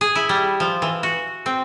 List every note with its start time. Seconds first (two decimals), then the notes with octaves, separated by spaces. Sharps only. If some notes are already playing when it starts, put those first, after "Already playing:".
0.01 G#4
0.15 E4
0.29 G3
0.60 F3
0.82 E3
1.03 F#4
1.46 C4